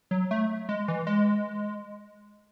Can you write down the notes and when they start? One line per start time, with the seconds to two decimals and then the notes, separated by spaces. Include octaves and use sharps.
0.11 F#3
0.31 A3
0.69 G#3
0.88 E3
1.07 G#3